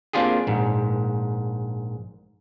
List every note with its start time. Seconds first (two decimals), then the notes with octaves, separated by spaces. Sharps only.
0.13 A#3 C4 D4 F4 G4 G#4
0.47 A#1 G#2